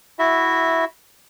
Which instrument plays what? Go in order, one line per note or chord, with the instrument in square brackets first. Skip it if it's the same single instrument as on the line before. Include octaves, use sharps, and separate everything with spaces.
[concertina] E4 F#4 E5